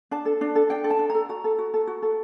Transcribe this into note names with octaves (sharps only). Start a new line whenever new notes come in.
D4 A5
A4
D4
A4
D4 G5
A4
A5
D4
A4 A#5
F#4 A#5
A4
F#4
A4
F#4
A4